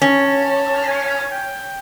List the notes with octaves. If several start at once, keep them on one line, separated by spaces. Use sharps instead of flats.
C#4 A5
G#5
G5